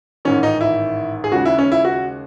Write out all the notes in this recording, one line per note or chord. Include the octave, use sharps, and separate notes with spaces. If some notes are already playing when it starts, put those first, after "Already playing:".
A1 G#2 D#3 C#4
D#4
E4
G#4
D#2 C#3 G#3 F#4
E4
C#4
E4
F#4